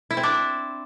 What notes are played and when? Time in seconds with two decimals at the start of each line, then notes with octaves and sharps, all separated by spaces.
0.11 E4
0.17 C4
0.23 D4